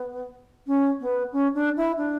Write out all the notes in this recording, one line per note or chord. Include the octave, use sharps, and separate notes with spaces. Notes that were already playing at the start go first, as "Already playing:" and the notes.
Already playing: B3
C#4
B3
C#4
D4
E4
D4